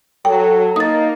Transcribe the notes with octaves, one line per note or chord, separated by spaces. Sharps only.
F#3 A4 G5
A#3 D#4 D#6 A6